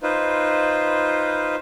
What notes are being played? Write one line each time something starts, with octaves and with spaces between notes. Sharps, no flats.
D#4 F4 B4 C5